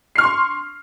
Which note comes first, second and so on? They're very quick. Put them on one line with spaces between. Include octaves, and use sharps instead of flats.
C7 F6 C#6 C6